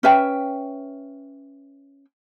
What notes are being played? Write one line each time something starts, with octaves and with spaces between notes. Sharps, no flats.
C#4 B4 E5 G5